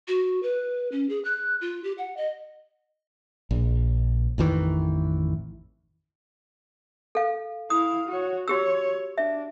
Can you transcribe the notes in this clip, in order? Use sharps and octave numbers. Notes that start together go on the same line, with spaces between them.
F#4
B4
C#4
G#4
F#6
F4
G4
F#5
D#5
A#1
A1 F2 D#3 E3
A4 F5
E4 F5 D#6
F#4 C#5
F#4 G4 C#5 E6
D4 E5